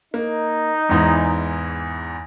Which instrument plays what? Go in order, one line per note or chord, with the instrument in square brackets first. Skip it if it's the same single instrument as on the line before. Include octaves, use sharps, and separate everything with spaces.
[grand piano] A#3 [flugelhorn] D#4
[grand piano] E2 G#2 E3